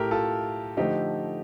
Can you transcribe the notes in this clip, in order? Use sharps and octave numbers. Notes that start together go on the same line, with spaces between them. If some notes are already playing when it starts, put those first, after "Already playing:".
Already playing: A2 A3 G4 A#4
F4 A4
D3 F3 A3 D#4 G4